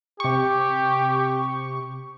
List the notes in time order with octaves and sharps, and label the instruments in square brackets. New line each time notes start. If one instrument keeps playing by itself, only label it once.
[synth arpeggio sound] C3 C#6 [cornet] G4